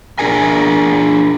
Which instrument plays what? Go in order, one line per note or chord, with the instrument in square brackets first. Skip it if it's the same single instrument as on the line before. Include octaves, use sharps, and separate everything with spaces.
[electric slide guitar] D4 G#4 A#4 G#5